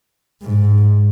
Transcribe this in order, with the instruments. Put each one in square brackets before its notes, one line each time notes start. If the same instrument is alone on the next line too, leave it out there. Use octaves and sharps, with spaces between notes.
[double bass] G#2